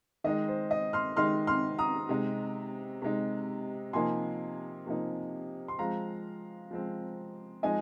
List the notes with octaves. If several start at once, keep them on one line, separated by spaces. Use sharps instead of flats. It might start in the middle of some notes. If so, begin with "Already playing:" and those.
D#3 G#3 D#4 D#5
C5
D#5
C6 F6
D#3 G#3 D#4 C6 F6
C6 F6
A#5 D#6
C3 G#3 D#4
C3 G#3 D#4
C3 F3 A#3 D#4 G#5 C6
C3 F3 A#3 D#4
C6
F3 G#3 C4 F5 A#5
F3 G#3 C4
F3 G#3 D#4 D#5 G#5